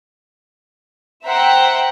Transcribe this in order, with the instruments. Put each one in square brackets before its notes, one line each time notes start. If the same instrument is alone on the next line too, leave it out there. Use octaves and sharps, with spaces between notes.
[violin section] C5 E5 F#5 G5 A#5